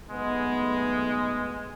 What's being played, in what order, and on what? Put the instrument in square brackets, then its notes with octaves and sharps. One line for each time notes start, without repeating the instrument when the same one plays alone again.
[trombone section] B1 A3 B3 [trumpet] G#3